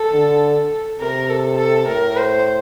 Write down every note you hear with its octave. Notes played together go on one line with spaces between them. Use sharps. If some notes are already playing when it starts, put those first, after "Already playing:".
Already playing: A4
D3
C3 A#4
A4
A4
A2 A#4
C5